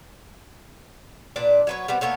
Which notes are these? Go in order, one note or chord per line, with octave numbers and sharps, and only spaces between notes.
A#2 D4 B4 D5
F#3 B4 C#5
G3 B3 C4
A#3 B3 A4 C#5